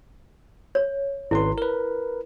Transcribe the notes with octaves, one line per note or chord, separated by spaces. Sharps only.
C#5
G#1 E4 B4 C6
A#4 B4